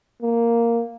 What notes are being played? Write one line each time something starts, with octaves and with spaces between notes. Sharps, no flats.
A#3